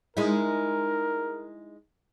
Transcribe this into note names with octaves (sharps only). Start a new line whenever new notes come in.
G#3 D#4 E4 A#4